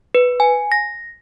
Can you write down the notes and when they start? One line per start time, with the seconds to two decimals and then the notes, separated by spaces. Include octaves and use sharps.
0.15 B4
0.40 G#5
0.72 A#6